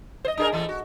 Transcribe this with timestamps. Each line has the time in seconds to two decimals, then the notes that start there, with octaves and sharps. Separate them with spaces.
0.25 C5 D#5
0.37 D4 G#4 A#4
0.52 E3 A3
0.69 F#4